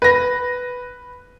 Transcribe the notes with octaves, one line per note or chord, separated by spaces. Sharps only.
B4 A#6